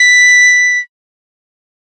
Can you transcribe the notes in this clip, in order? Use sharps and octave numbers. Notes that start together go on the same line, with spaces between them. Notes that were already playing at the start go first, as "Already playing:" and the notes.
Already playing: B6